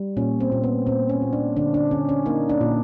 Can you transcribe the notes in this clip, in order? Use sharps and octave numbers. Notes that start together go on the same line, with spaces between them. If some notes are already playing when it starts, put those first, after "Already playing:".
Already playing: G3
A#2 C#4
C4
A#2
B3
A#2 C4
C#4
A#2
D4
D3 D4
D4
D3 C#4
C#4
A#3 D#4
D4
A#2